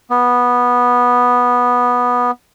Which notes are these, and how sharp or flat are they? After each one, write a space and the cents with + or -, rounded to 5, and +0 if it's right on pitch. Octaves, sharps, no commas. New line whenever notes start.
B3 -10